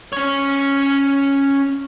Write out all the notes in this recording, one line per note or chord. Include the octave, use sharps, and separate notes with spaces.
C#4 C#5